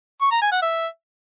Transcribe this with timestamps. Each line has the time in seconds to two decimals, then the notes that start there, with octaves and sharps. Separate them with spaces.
0.21 C#6
0.31 A#5
0.42 G#5
0.52 F#5
0.62 E5